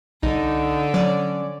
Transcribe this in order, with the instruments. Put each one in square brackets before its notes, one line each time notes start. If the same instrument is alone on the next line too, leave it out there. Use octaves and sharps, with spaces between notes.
[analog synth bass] C2 [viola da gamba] D3 [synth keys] D#4
[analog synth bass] F#3 [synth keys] C#4 D5